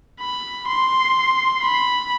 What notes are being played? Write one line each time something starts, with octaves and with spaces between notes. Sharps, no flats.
B5
C6
B5